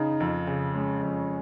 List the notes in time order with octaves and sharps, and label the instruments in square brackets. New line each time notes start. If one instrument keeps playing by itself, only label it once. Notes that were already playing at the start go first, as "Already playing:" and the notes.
Already playing: [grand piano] C#3 [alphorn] D#4
[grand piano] F2
C#3
[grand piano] G#3 [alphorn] C#4
[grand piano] F2